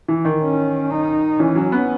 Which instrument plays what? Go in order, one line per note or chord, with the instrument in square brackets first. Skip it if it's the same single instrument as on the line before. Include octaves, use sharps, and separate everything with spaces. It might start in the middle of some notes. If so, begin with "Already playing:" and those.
[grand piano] E3
D#3
[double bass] C#4
D#4
[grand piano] E3 [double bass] C#4
[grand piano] F#3
B3